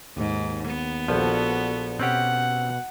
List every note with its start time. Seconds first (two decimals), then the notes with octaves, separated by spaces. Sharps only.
0.16 D#2 G#2
0.68 B3
1.08 A#1 F3 F#4 A4 B4
2.00 B2 C4 C#4 G4 F#5